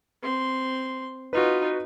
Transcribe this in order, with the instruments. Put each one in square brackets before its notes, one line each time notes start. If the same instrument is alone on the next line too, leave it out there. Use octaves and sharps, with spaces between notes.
[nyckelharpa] C4 C6
[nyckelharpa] D#4 F4 [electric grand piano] F#4 B4